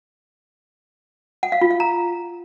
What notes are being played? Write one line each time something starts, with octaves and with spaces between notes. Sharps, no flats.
F#5
F5
F4
F5
A#5